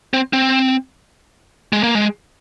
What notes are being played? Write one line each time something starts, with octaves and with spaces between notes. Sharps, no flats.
C4
C4
G#3
A#3
G#3